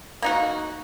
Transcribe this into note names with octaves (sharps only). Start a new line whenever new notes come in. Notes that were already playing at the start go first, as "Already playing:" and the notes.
A#3 D#4 F#4